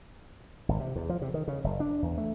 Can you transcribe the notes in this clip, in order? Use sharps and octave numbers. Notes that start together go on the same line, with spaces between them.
G#1
C3
E2
F3
C3
D#3
C#3
F#1
D4
E2
A3